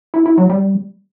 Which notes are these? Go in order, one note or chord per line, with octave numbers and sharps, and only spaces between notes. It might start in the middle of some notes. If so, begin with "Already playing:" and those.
E4
E4
F#3
G3